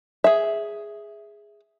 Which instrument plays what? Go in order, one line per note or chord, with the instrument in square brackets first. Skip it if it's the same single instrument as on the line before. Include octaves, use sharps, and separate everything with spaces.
[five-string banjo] G#4 E5